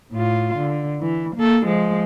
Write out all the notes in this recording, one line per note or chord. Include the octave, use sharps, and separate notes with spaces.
A2 F4
D3
E3
A#3 A4
F3 G#3